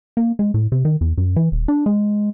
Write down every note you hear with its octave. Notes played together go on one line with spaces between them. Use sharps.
A#3
G#3
A2
C3
D#3
E2
F#2
E3
D#1
D4
G#3